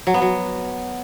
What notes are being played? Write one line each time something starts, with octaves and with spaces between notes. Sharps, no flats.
F#3
B3
F#3